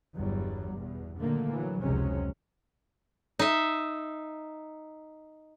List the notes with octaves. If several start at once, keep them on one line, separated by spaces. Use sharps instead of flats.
G1 E2 F#3 G3
E2 B2
A#2 D3 D#3 F#3 A3 A#3
E3 F#3
F1 C#2 C3 F#3 G#3 C#4
D#4 E5